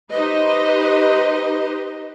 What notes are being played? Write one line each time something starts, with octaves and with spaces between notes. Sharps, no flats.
D#4 G4 B4 C5 D#5